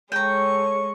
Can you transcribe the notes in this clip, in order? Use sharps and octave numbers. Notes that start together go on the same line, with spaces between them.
G#3 A4 C#5 G5 A#5 C#6